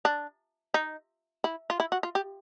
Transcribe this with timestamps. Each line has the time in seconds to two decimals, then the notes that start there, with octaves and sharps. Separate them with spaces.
0.05 D4
0.74 D#4
1.44 E4
1.70 F4
1.80 E4
1.92 F#4
2.03 F4
2.15 G4